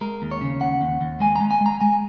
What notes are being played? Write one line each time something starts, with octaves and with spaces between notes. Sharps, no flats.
G#3 A#4
D#2
C#5
C#3
D#2 F#5
D#2
D#2
G#3 G#5
G#3 A#5
G#5
G#3
A#5
G#3 G#5